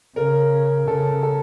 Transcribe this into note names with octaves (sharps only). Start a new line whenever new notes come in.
C#3 A#4
C#3 A4
A4